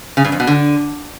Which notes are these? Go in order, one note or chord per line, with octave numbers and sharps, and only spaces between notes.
C#3
G2
F2
B2
D3